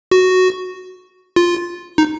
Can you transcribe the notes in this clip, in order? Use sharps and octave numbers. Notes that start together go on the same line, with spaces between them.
F#4
F4
D#4